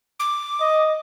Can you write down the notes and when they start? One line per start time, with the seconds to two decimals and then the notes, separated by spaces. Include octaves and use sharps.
0.20 D6
0.61 D#5